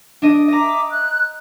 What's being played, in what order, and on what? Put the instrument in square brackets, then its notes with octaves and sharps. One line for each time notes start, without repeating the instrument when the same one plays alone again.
[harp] D4 D#5 D#7
[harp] D#5 A#5 [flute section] E5 D6
[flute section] F#6